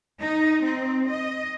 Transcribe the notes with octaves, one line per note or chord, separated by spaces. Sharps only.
D#4
C4
D#5